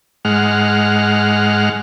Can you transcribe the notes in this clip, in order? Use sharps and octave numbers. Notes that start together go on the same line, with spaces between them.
G#2 G#3 F#5 F6